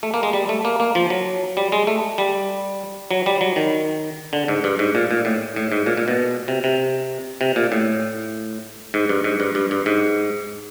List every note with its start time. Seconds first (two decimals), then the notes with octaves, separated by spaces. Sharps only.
0.03 A3
0.14 A#3
0.23 G#3
0.33 G3
0.49 A3
0.65 A#3
0.80 A#3
0.95 F3
1.10 F#3
1.57 G3
1.72 G#3
1.87 A3
2.18 G3
3.11 F#3
3.26 G3
3.41 F#3
3.56 D#3
4.33 D3
4.48 G#2
4.64 G2
4.79 G#2
4.95 A#2
5.11 A#2
5.25 A2
5.56 A2
5.72 G#2
5.86 A#2
5.97 A#2
6.08 B2
6.48 C3
6.64 C3
7.41 C3
7.56 A#2
7.72 A2
8.94 G#2
9.09 G2
9.24 G#2
9.40 G2
9.55 G2
9.71 G2
9.86 G#2